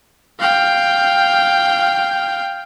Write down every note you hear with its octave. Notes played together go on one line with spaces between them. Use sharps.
F5 G5